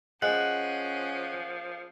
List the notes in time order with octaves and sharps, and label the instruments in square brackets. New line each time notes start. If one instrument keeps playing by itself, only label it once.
[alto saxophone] F3 [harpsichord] G#3 [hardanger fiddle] C#4 G#4 [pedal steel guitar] F#5